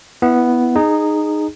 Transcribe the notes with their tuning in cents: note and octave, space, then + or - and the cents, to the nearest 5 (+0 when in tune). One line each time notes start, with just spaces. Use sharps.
B3 +0 E4 +0
D#4 -15 G#4 +0